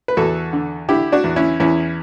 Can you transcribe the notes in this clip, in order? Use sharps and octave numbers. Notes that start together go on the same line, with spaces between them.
B4
E2 F#4 A4
D3
D3 E4 G4
D4 F#4
E2
C#4 E4
E2 C#4 E4